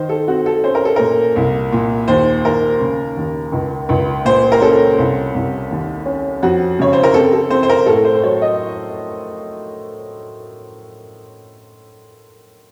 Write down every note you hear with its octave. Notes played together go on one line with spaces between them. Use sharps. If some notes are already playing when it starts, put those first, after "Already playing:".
Already playing: D#3 C5
A4
C4 F#4
A4
C#4 C5
A#4
A4
A#2 A#4
C2
A#2
D#2 C5
D#2 A#4
C#3
D#2
C#2
C#2
A#2 C5
A#4
C#4 A4
C2
C2
D#2
C#4
F2 F#4
C#3 C#5
C5
A#4
C4 A4
A4
C4 C5
C5
A#4
A2 A4
C5
C5
F#3 C#5
D#5